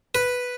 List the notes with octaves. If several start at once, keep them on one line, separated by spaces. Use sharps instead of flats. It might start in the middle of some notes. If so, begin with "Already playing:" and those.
B4